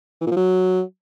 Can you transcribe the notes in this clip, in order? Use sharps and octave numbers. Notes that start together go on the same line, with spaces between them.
E3
A#2
F3
F#3